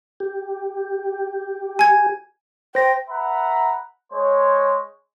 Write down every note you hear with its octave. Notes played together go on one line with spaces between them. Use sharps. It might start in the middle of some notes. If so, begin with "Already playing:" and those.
G4
G#5 G#6
C5 G5 A#6
B4 E5 F#5 A#5 B5
G#3 C5 C#5